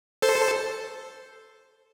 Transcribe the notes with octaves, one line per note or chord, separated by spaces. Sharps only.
A4 C5